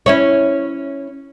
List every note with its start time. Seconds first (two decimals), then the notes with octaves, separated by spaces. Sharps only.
0.06 C#4 E4 C#5